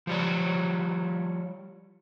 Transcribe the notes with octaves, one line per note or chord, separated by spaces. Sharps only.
F3 G3 C#5